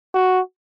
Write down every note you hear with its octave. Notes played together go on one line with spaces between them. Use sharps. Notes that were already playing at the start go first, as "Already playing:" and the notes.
F#4